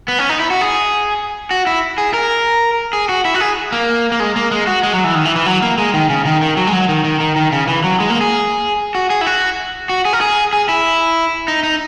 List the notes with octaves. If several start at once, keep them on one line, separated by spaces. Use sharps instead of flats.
B3
C#4
D#4
E4
F#4
G#4
F#4
E4
G#4
A#4
G#4
F#4
E4
F#4
G#4
A#3
A#3
G#3
A#3
G#3
F#4
G#3
F#3
E3
D#3
E3
E3
F#3
A#3
G#3
D#3
C#3
D#3
D#3
F#3
G#3
F#3
D#3
D#3
D#3
D#3
C#3
E3
F#3
G#3
A#3
G#4
F#4
G#4
E4
F#4
F#4
G#4
A#4
G#4
G#4
E4
D#4
D#4